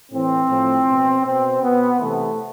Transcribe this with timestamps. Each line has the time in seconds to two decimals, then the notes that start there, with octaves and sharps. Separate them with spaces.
0.12 A2 E3 C4
0.50 A2 F3
0.87 B2
1.25 B2 C4
1.62 B2 B3
2.00 C3 E3 A3